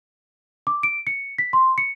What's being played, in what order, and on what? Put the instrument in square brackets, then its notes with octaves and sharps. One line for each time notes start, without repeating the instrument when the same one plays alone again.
[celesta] D6
D7
C#7
B6
C6
C#7